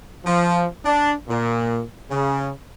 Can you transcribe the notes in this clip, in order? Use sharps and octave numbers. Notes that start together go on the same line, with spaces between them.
F3
D4
A#2
C#3